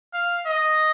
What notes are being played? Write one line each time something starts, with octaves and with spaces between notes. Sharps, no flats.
F5
D#5